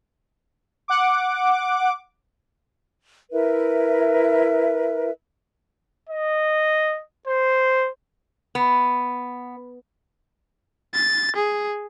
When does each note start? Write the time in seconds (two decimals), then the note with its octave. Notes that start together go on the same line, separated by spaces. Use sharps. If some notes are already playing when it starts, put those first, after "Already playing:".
0.88 F#5 D6
3.32 E4 A#4 B4 E5
6.09 D#5
7.27 C5
8.55 B3
10.94 A6
11.36 G#4